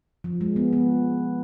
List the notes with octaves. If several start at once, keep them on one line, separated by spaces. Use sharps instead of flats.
F3
G#3
B3
B3